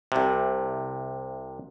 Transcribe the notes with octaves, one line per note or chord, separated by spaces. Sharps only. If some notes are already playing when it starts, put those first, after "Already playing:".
C2 C3